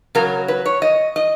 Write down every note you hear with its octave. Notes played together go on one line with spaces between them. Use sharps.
C#3 F#3 A#4
B4
C#5
D#5
D#5